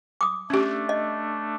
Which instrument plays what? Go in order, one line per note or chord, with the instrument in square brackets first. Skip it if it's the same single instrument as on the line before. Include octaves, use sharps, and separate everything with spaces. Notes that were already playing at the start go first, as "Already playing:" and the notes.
[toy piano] D6 D#6
[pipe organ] A3 D4 [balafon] C#4 G4
[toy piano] D#5